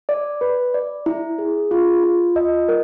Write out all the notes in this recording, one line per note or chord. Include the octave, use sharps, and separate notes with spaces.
D5
B4
D5
E4
G#4
F4
F4
D#5
A#4